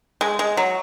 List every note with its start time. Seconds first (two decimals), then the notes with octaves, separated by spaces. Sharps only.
0.21 G#3
0.39 G#3
0.57 F#3